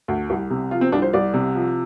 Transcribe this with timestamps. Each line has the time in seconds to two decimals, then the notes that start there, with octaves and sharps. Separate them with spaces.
0.08 D2
0.30 C2
0.50 C3
0.71 F3 F4
0.81 C4
0.92 C2 D4
1.02 C5
1.13 C2 D5
1.34 C3
1.55 F3